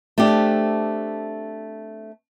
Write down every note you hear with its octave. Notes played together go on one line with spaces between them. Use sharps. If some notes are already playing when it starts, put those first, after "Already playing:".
A3 C4 D4 G4